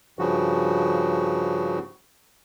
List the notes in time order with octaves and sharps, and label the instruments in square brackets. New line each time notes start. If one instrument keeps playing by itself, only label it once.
[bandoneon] G2 C#3 F3 F#4